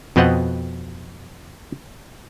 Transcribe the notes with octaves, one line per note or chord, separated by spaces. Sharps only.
F2 B2 B3 C4 D#5 F#5